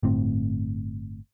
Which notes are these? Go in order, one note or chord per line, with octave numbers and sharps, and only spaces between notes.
G1 A2 C4